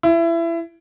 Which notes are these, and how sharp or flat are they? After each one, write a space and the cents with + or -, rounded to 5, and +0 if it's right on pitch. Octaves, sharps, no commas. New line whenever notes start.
E4 +25